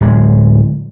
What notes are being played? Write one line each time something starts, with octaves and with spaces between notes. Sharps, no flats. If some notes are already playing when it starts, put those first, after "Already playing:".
D1 G#3